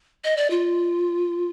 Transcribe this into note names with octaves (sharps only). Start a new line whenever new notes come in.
D#5
D5
F4